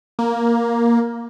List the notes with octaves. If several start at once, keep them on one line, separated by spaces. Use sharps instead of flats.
A#3